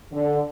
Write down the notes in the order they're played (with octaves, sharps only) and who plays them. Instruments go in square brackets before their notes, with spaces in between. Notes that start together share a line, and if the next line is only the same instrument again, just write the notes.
[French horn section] D3